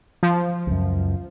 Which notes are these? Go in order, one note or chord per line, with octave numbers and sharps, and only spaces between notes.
F3
C#2 F#2